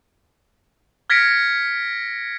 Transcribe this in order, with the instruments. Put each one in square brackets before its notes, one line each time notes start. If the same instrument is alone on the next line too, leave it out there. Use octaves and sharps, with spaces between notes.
[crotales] F6 G#6 A#6 B6 C#7 D7